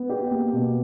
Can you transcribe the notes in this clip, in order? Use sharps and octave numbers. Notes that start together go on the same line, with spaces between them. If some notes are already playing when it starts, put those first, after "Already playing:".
Already playing: B3
G4
A#3
B2